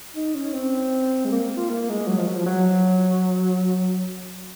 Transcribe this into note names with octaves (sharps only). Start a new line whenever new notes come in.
D#4
C#4
C4
G#3
A#3
F4
A#3
G#3
F#3
F3
F#3
F3
F#3